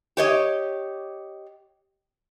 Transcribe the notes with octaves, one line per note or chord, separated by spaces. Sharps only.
G4 C#5 D#5